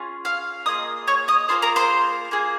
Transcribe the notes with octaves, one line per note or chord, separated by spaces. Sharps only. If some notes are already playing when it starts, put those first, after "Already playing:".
Already playing: C#4 F4 G#4
F5 F6
A#3 F4 G#4 D#5 D#6
C#5 C#6
D#5 D#6
A#3 F4 G#4 C5 C6
A#4 A#5
C5 C6
A#3 F4 G#4